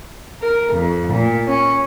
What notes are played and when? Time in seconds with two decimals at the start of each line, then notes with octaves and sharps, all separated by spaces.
0.41 A#4
0.73 F2
1.12 A#2
1.47 C#4